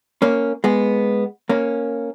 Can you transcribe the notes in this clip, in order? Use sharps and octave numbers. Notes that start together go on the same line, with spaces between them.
A#3 C#4
G#3 B3
A#3 C#4